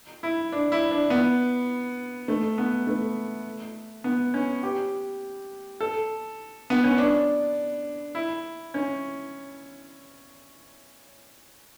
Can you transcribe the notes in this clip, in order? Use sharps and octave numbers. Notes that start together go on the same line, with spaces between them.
E4
D4
E4
D4
B3
A3
B3
A3
B3
C#4
G4
A4
B3
C#4
D4
E4
C#4